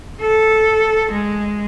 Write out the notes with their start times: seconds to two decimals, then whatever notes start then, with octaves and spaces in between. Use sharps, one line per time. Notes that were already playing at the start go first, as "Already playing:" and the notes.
0.21 A4
1.12 G#3